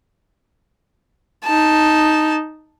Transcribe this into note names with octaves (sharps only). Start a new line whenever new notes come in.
D#4 A5